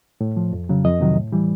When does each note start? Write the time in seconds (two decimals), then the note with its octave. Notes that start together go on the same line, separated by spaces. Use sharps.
0.21 A2
0.37 F3
0.53 F2
0.69 C#3 F#3
0.85 F2 D#5
1.00 C3 D#3 F#3
1.17 A2
1.32 E3 G3